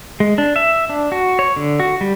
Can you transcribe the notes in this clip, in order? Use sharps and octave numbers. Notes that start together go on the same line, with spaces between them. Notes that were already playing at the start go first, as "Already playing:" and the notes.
G#3
D4
E5
D4
F#4
C#5
D3
F#4
G3